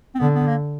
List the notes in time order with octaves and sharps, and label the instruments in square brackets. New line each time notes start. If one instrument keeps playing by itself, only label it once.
[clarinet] C4
[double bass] D3 [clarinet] B3
[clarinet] B3
A#3